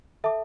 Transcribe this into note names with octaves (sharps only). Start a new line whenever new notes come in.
A4 E5 A5 D6